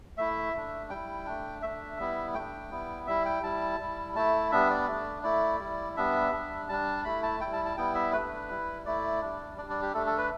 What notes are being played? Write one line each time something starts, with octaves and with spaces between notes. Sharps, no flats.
A3 E4 E5
A3 D4
G3 E4 G5
A3 D4
A3 D4 E5
G3 B3 E4
A3 D4 G5
G3 B3 E4
G3 E4 E5
G5
G3 E4 A5
G3 E4
A3 E4 A5
G3 B3 D4 E5
D5
A3 D4
A3 E4 D5
G3 E4
G3 B3 D4 E5
G3 D4
G3 D4 A5
A3 E4 B5
A5
G3 E4 G5
A5
A5
G3 B3 E4 G5
E5
A3 D4 B4
G3 E4
A3 E4 D5
G3 D4
G3 D4 D5
D5
G4
A3 D4 A4
A4
B4